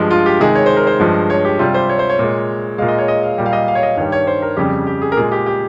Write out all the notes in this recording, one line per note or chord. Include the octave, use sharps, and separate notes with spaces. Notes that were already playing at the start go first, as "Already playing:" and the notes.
Already playing: G2 F3 G#3 G4
F4
G4
C3 D#3 G#3 G#4
C#5
C5
A#4
C5
G2 F3 G#3
C#5
G4
C3 G3 F4
C5
C#5
C5
C#5
A#2 G#3
A#2 G#3 F5
D#5
C#5
D#5
F5
A#2 G3
F5
D#5
F5
C#5
D#5
G2 D#3 G3 C#5
C#5
C5
A#4
F2 C#3 G3 G4
G4
G#4
A#4
A#2 G#3 G#4
G4
G4